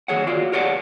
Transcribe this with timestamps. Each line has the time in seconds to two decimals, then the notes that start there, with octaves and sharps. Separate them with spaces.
0.08 D#3 G#4 C#5 F#5
0.27 F4 F#4 D5 F5
0.52 G4 A#4 C#5 D5 F5 F#5